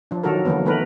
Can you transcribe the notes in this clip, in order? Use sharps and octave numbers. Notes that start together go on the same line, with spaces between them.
F3 D4
D#3 F#3 D4 F#4 A4 A#4
D3 E3 F#3 A#3 B3
D#3 E3 A3 B3 A#4 B4